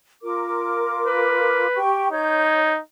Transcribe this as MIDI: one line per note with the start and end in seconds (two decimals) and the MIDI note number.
0.23 1.66 65
0.23 1.66 70
0.23 1.66 86
1.06 1.80 71
1.75 2.09 67
1.75 2.09 79
1.75 2.09 85
2.12 2.80 63
2.12 2.72 73
2.12 2.72 91